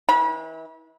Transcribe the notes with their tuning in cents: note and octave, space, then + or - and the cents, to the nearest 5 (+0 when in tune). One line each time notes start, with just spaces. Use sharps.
E3 -35 B5 -40